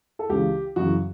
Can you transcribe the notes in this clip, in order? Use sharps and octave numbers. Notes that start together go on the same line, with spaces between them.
A4
C#2 C#3 E3 G4
F#2 C#3 E3 F#4